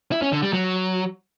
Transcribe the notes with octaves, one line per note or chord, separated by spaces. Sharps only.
E4
C#4
D3
G3
F#3